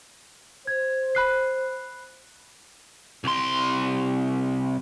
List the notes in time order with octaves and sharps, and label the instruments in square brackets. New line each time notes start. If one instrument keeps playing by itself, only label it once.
[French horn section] C5 [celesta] G#6
[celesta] B5 F#6 C7
[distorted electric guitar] C2 C6